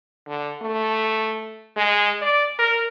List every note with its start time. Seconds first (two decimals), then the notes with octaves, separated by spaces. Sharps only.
0.28 D3
0.62 A3
1.77 G#3
2.22 D5
2.59 A#4